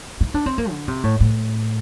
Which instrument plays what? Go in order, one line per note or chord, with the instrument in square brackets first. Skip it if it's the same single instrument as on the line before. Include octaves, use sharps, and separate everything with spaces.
[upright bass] D#4
D4
C4
A#3
D3
C3
A2
A2